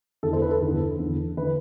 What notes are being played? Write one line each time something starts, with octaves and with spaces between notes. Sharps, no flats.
E2 D3 A4
C5
B4
A4
E2 D3
E2 D3
D3 B4